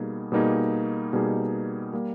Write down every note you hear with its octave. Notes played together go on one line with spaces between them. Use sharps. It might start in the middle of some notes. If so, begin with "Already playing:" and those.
Already playing: B2 G3 A#3 D#4 G#4
B2 G3 A#3 D#4 G#4
B2 G3 A#3 D#4 G#4
G3 A#3